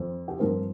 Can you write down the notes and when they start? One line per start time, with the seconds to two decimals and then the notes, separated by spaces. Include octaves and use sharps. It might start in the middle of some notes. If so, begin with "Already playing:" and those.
Already playing: F2 F3 C4
0.28 G4
0.39 G2 F3 C4 A#4